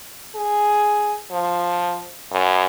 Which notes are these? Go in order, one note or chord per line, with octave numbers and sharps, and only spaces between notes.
G#4
F3
F#2